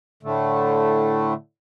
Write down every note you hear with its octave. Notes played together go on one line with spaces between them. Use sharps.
A2 D3 A3